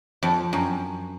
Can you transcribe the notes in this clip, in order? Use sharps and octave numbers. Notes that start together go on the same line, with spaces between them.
F2
F#2